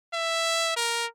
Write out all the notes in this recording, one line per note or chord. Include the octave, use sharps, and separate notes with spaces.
E5
A#4